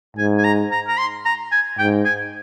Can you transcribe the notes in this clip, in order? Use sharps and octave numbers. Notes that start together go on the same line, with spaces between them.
G#2 G#5
G#5
A#5
A#5
A#5
C6
A#5
G#5
G#2 G5
G#5